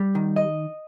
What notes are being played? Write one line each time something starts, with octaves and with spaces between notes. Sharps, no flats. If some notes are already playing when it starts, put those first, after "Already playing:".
Already playing: G3
D#3
D#5